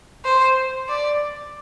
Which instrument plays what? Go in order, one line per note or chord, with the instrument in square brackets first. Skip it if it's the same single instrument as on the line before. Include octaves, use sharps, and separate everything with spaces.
[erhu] C5
D5